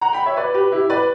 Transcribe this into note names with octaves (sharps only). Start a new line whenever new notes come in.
F#5 A#5
G5 B5
C#5 E5
B4 D5
G4 B4
E4 G4
B4 D5